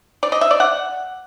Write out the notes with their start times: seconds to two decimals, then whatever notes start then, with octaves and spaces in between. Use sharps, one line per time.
0.23 D5
0.32 D#5
0.41 E5
0.51 D5
0.60 F#5